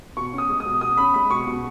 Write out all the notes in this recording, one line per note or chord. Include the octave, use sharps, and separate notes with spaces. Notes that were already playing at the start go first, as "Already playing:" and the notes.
B2 C#6
C#4
D#6
G#3
D#6
B2
B2 D#6
C#4 B5
G#3 B5
B2 C#6
B2